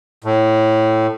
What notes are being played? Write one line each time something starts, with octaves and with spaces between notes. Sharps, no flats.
A2